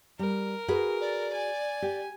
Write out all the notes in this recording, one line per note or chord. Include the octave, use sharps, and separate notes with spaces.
G3 A#4
F#4 G#4 B4
D5
G#5
G4